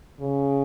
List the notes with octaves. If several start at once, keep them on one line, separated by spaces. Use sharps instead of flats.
C#3